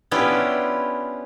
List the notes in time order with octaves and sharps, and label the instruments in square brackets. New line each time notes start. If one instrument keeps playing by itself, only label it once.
[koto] B3 C#4 D4 E4 F4 G4